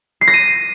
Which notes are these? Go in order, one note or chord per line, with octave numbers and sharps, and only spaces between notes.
C7
A#6
D#7